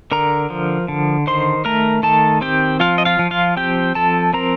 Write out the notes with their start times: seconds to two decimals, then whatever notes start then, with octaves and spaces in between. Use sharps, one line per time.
0.12 D3 A#4 A#5
0.50 F3
0.88 D3
1.27 D#3 C5 C6
1.65 A3 A#4 A#5
2.03 D#3 A4 A5
2.41 C4 G4 G5
2.80 F3 F4 F5
2.98 D#5
3.05 F4 F5
3.19 F3
3.31 F4 F5
3.57 C4 G4 G5
3.95 F3 A4 A5
4.33 C4 A#4 A#5